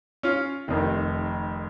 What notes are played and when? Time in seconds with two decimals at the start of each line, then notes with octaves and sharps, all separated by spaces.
0.23 C#4 F4
0.68 F1 F2 D#3